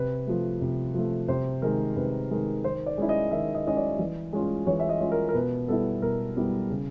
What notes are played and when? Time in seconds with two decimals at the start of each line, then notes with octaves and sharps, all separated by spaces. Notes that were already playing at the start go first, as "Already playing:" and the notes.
Already playing: C3 B4
0.27 F3 A3
0.61 C3
0.94 F3 A3
1.28 C3 C5
1.62 D#3 G#3 A#4
1.96 C3 B4
2.31 D#3 G#3
2.64 D#3 C5
2.86 D5
2.98 G#3 C#4 E4
3.09 D#5
3.31 D#3 E5
3.55 D#5
3.66 G#3 C#4 E4 D#5
3.77 D5
3.99 E3
4.33 G#3 C#4 F4
4.66 E3 C#5
4.80 E5
4.89 D#5
5.00 G#3 C#4 F4
5.12 A#4
5.29 A#4
5.34 B2 B4
5.68 G3 B3 E4 A4
6.02 B2 A#4
6.36 G3 B3 E4
6.69 C#3